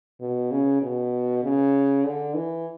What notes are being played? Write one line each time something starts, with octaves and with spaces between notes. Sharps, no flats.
B2
C#3
B2
C#3
D3
E3